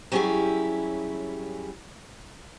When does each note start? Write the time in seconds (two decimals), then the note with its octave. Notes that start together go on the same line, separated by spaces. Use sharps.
0.12 F#3 G3 C#4 E4 G4 G#4